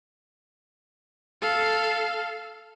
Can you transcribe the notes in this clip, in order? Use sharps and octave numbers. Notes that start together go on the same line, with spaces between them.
A4 F5